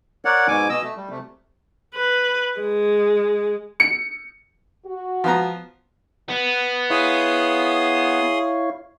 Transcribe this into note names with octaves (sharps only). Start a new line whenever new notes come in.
A#4 C#5 D5 F#5
G#2 B2 G#5 D6
B2 D#5 E6
A3
G3
C3 A3
B4
G#3
C#7
F#4
F3 B3 A#5
B3
E4 G#4 C#5 F5 C6 D#6